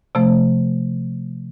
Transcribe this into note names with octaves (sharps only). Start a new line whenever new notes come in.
C3 F3 A3